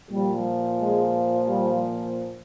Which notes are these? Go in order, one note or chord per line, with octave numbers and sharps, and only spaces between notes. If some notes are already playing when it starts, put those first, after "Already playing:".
A#2 F3 G3
G#3
G3